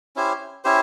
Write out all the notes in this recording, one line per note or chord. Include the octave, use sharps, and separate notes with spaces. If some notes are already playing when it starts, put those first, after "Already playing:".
C#4 E4 G4 C5
C#4 E4 G4 C5